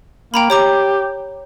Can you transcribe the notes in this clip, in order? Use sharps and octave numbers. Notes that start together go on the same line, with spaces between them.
A#3 G5 A#5 B5
G4 C#5 A#5 D6